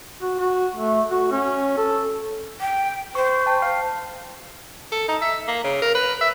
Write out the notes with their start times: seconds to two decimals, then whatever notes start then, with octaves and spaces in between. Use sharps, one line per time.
0.21 F#4
0.40 F#4
0.76 A3
1.11 F#4
1.32 C#4
1.77 A4
2.61 G5
3.15 C5 C#6
3.46 G5 A5
3.62 F5 F6 C7
4.92 A4
5.08 D#4
5.22 E5
5.48 A#3
5.64 C#3
5.82 A#4
5.95 B4
6.21 E5